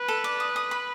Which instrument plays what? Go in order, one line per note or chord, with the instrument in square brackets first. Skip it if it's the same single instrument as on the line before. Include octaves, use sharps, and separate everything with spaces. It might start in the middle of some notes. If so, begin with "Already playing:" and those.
Already playing: [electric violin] B4
[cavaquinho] A4
D5
D#6
D#6
B5